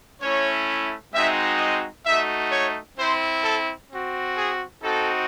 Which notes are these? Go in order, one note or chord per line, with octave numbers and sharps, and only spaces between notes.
A3 C#4 E4 C#5
G#3 C4 D#4 F#4 E5
D#5
A3 D#4 F#4 E5
C#5
C4 E4 C5
A4
C4 F#4
G#4
C4 D#4 F#4 A4